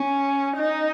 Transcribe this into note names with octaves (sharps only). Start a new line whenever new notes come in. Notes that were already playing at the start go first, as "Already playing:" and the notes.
Already playing: C#4
D#4